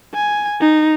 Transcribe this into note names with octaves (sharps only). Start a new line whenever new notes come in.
G#5
D#4